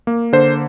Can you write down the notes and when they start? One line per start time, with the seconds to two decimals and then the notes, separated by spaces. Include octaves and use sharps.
0.07 A#3
0.33 D3 C5